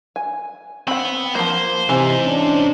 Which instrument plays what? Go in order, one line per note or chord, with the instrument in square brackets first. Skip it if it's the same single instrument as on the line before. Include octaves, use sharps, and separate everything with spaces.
[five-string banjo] G#5
[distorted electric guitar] B3 B5 [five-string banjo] C4 F#5
[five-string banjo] F3 A#3 [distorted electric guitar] C5
[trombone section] C3 [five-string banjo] E3 [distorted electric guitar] D#4 C5
[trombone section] C#4 D4